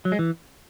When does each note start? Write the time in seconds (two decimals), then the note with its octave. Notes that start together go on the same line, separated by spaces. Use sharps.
0.05 F#3
0.12 G#3
0.19 E3